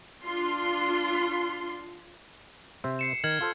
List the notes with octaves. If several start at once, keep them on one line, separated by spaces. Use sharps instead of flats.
D4 F4 C6
C3 C5 E5
C7 C#7 E7
D#3 F6 G#6 F#7
F4 A4 C5